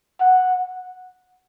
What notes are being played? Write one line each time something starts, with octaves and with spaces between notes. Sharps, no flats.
F#5